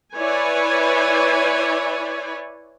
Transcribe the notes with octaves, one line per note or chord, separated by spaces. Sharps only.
E4 B4 C#5 D5 G#5